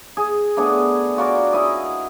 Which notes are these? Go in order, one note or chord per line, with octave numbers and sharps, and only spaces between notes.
G#4
A3 B3 D4 G#4
F4 F#4 A#4 D5
E4 A#4 D#5